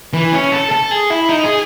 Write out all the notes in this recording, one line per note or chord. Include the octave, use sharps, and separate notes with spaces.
E3
C#4
A4
A4
G#4
E4
D#4
G#4